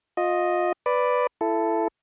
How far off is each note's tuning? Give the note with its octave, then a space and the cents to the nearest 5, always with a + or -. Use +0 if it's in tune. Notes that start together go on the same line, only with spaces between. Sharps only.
F4 +25 D#5 +0
B4 +5 D5 +0
E4 +25 A4 +0